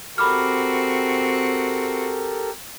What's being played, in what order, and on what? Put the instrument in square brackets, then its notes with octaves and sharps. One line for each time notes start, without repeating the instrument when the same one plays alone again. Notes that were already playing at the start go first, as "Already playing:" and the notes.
[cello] C4 F#4 [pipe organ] G4 A4 A#4 [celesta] B5 D6 F6